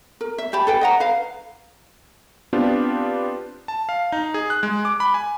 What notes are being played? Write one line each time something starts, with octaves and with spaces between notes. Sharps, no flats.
A#4
E5
G4 A5 B5
A4 B4 G5
D#5 F#5 A#5
B4 F5
B3 C4 D4 F4 G4
A5
F5
D#4
G#4
F#6
G#3
D6
B5
G#5